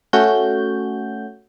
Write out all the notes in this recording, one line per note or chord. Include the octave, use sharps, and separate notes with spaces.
A3 C#4 F#4 G6